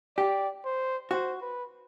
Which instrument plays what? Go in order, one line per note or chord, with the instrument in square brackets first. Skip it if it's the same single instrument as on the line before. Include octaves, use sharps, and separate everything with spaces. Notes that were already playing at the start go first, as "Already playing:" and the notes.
[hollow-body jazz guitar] G4 [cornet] D5
[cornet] C5
[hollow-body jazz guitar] F#4 [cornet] C5
[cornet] B4